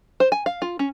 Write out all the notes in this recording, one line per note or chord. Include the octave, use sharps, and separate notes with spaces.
C5
G#5
F5
F4
C#4